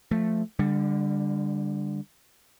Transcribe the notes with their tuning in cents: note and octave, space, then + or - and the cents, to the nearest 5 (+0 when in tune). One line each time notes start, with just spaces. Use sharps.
F3 +0 A3 +0
D3 +0 G3 +30